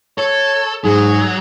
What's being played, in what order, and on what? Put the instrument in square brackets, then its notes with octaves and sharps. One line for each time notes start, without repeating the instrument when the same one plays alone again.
[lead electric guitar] A4 [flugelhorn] C#5
[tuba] G#2 [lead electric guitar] F#3 [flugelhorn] G#4